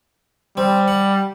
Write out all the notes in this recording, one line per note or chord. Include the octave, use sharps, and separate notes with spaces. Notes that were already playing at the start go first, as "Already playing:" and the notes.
G3 C4
F#5